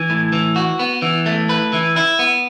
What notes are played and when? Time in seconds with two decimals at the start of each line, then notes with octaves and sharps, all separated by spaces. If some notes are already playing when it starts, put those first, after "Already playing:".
Already playing: E3
0.10 A2
0.33 E3
0.56 F#4
0.79 B3
1.02 E3
1.26 A3
1.49 B4
1.73 E3
1.96 E4
2.19 B3